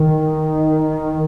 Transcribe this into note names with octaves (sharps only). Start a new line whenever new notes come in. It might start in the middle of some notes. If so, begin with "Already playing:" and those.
Already playing: D#3